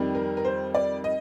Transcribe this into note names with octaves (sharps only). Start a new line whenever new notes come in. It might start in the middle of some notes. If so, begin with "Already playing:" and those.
Already playing: F2 D#3 G3
A#4
A#4
C5
D5
D#5